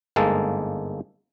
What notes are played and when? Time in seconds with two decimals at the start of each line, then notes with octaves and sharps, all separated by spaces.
0.16 G1 G#2 G#3 A#3 A4